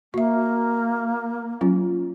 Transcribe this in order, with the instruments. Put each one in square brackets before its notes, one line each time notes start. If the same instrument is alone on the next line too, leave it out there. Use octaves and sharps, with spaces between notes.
[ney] A#3 [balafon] F#4 E5
[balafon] F#3 C#4 F4